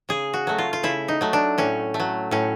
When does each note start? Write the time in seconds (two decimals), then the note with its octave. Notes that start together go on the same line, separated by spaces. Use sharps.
0.09 C#3 G#4
0.34 F#4
0.47 F#3 A3
0.58 F4
0.73 F4
0.83 C#3 E4
1.08 D#4
1.21 F#3 A3
1.33 D4
1.58 A2 C#4
1.94 A3
2.00 F#3
2.31 A2 C#4